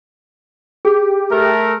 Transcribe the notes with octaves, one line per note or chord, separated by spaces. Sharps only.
G4 G#4
A3 A#4